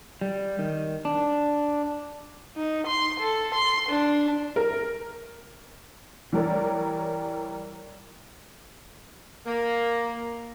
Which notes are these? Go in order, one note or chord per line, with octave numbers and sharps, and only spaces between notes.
G3
D#3
D4
D#4
C6
A4
C6
D4
A#4
E3 G3 G4 A#4 C#5 D5
A#3